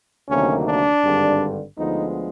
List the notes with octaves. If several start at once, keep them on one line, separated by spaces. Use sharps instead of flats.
D2 C3 D#3 F#3 A#3 C#4
D4
G#1 G2 D3 G3
D2 D3 F3 G#3 B3 D#4